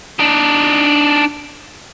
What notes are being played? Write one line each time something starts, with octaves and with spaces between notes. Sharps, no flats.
D4 D#4